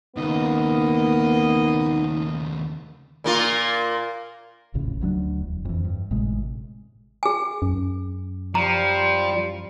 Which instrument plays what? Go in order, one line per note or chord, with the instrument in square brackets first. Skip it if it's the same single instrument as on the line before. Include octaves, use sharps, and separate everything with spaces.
[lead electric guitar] D#2 C#3 [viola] A#3 D#5 [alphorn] B3 [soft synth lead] D#4
[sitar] A#2 A#3 F4
[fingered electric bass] E1 A#1 A2 C#3
D2 F#3 A3 D4
E1
F2 E3
G2
G#1 A2 C3 G#3
[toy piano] G#4 G#5
[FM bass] F#2
[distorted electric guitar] F3 [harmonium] G3 [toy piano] A#5